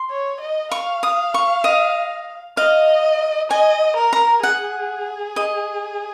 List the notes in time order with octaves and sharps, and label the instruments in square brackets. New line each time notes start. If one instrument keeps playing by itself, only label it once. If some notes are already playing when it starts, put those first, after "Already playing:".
Already playing: [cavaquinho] C6
[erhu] C#5
D#5
[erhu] F5 [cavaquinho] C#6
[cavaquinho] D#6
C#6
D#5
[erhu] D#5 [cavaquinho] F5
[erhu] D#5 [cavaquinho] G#5
[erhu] A#4
[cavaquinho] A#5
[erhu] G#4 [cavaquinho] F#5
[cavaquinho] D#5